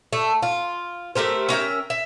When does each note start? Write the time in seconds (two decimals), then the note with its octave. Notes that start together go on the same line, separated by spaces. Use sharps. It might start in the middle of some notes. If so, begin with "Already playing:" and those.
0.13 A3
0.43 F4
1.15 A3 G4 A#4 C5
1.49 C#4 A#4 E5 G5
1.90 E5